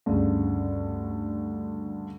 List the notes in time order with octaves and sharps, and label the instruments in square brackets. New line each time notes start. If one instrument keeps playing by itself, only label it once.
[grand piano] D2 G2 C#3